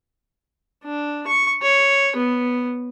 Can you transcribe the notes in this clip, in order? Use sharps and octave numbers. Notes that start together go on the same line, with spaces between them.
D4
C#6
C#5
B3